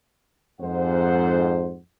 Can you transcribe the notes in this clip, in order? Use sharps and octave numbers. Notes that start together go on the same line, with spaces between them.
F2 G#2 C5 F#5